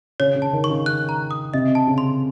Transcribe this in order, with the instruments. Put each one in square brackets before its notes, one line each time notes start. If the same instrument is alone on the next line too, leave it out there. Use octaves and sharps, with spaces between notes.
[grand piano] C#3 [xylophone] C#5
[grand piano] C#3
[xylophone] A5
[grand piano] D#3
[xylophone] C#6
[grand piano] C#3
[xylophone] F#6
A#5
D#6
[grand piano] C3 [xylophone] D#5
[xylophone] A5
[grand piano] C#3
[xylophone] C6